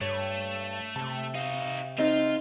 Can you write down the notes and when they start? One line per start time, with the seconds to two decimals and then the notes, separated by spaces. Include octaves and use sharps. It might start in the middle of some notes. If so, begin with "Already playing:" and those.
0.01 G2 A3 C#5
0.96 C3 A5
1.35 D#4 F#4 F5
1.98 C4 D#4 F4 D#5